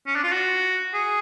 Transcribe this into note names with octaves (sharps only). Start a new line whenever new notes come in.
C#4
D4
F4
F#4
G#4